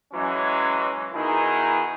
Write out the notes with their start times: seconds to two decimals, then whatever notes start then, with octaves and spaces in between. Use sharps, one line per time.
0.13 E3 F#3 G#3 C#4
1.14 B2 D#3 D#4 E4 G#4